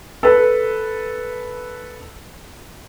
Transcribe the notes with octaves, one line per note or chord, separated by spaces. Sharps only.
A4 B4